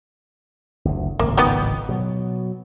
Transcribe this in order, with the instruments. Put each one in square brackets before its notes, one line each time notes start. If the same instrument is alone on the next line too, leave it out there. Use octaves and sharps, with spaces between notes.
[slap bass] F#1 D2
[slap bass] D1 G#1 C#2 [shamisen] A#3
[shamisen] B3 D#4 G4
[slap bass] B2 F#3